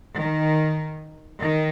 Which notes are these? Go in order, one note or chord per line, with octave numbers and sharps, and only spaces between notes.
D#3
D#3